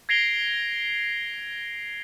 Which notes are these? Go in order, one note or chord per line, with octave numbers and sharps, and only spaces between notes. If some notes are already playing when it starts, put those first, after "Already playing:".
G#6 A#6 C7 D7 F7 G7